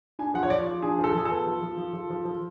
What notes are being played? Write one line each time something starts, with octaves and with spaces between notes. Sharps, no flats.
D4 G#5
F3 F#5
C#5
F3 D5
F3
D4 G#4
F3 A4
F3 G#4
A4
B3
F3
F3
F3
F3
F3
F3